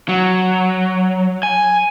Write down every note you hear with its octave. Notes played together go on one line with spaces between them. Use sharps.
F#3
G#5